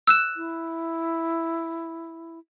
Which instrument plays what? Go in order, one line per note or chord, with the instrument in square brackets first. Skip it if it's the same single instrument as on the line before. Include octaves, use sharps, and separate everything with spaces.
[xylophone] E6 F#6 E7
[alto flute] E4